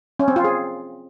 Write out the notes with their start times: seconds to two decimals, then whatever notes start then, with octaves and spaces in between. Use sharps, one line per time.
0.19 C#4
0.28 C4
0.36 F4
0.44 G#4